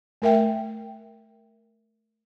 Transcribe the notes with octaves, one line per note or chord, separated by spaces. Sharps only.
A3 A#4 E5 G5